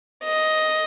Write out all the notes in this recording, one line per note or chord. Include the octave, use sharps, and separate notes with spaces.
D#5